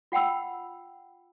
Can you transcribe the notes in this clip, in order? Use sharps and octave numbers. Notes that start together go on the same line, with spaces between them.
F4 F#5 G5 B5 E6